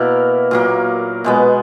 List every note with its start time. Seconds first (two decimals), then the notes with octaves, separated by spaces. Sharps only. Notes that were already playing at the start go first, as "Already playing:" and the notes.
Already playing: B2 A#3 E4 A#4
0.51 A#2 F#3 A#3
1.24 B2 G#3 B3